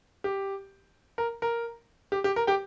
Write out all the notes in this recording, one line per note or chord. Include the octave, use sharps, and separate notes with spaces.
G4
A#4
A#4
G4
G4
A#4
G4 G5